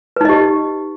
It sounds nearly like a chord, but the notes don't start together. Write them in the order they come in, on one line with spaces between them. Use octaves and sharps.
B4 D#4 D#5 G4